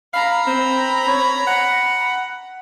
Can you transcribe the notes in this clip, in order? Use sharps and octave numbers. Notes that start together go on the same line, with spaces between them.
F5 A#5 B5
C4
C#5
F#5